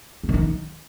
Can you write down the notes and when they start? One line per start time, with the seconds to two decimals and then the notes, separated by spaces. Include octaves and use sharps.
0.23 A#3
0.29 D#3
0.34 D#4